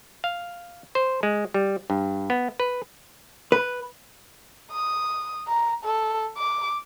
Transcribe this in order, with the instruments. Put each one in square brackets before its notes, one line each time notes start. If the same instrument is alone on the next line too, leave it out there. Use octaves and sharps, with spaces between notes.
[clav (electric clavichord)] F5
C5
G#3
G3
G2
B3
B4
[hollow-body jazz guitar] B4
[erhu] D#6
A#5
A4
D6